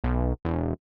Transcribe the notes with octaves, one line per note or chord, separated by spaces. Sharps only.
B1
E1